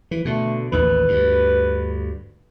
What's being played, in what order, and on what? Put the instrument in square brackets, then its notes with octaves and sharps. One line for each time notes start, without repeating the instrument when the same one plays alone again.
[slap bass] E3
[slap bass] B2 D3 [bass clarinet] A3
[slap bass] A1 D#2 D#3 [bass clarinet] B4
[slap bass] D2 G2